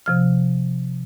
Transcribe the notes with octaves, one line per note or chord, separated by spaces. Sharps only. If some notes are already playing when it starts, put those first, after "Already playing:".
C3 F3 F6